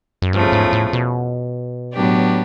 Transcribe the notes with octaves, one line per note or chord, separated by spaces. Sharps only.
F#2
E2 G2 C#3 F3 A3
G#2
A2
B2
A2 F#3 B3 D4 G4